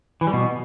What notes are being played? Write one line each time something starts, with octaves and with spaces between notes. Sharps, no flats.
E3
G3
B2